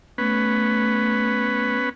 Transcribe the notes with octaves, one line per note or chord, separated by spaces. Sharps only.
A3 B3 C#4 B4